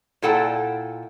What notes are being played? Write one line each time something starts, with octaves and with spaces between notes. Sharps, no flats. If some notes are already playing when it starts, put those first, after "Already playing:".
A#2 E4 A4 F#5 G5